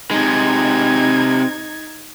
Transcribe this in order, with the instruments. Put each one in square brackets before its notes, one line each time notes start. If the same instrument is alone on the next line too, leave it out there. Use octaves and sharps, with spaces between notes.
[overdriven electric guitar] C3 G#3 [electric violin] D#4 G#6